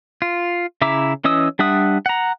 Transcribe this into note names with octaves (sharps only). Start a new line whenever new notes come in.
F4
C#3 E4 E5 A#5 D6
E3 C#4 D#5 D#6 E6
G3 D4 E5 F#5 D#6
F#5 A#5